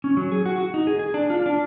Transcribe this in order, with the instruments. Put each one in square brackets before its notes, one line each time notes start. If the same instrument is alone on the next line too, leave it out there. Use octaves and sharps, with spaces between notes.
[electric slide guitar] C#4
F#3
G#4
F#4
F#4
D#4
G#4
G#4
D4
F4
D4